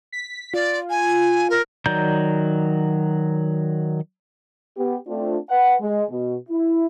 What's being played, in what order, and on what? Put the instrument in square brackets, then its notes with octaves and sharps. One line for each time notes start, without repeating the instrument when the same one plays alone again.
[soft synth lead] B6
[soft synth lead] F4 [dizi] D5
[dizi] G#5
A#4
[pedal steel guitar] D#3 F#3 D5 A#5 G6
[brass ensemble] B3 G4
A3 C4 D4 F4
B4 F#5
G#3
B2
E4